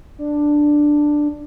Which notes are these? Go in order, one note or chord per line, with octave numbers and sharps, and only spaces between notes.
D4